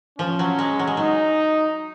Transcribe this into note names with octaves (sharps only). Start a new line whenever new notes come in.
F3 C#4
F#3
G#3
F#3
G#3
F#3 D#4